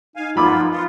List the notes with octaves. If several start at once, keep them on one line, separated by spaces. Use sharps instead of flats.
D#4 F5 G#5
F3 A#3 B3 F4 B5 D6
B3 F4